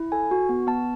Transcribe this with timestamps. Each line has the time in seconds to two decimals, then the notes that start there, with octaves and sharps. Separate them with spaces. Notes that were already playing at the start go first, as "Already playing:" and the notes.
Already playing: E4
0.12 A4 G#5
0.31 F#4
0.49 B3
0.67 B3 A5